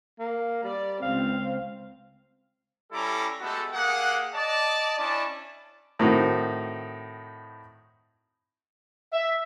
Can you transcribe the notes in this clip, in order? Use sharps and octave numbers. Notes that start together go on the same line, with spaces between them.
A#3
G3 D5
C#2 C4 F5
G3 C#4 E4 A4 A#5 D6
G#3 A3 B3 F#4 G4 A4
A#3 G4 G#4 F#5
D5 D#5 A5
C#4 D4 E4 D5 A5
A2 D#3 C4 D#4 F#4
E5